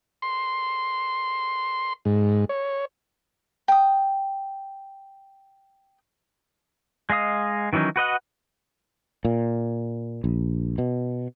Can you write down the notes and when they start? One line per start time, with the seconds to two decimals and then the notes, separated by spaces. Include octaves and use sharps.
0.22 C6
2.05 G#2
2.49 C#5
3.68 G5 D#6
7.10 G#3 D#5 F5 D#6
7.73 D#3 E3 F#3 C#4 D#4
7.96 F#4 B4 D#5 F#5
9.25 A#2
10.24 A#1
10.78 B2